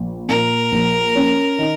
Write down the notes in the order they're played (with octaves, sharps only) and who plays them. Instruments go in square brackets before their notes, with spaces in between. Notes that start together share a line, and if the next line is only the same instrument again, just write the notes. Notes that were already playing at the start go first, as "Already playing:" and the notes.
Already playing: [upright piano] A#1
[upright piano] A#2 [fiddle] A#4
[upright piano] A#1
C#4
D#3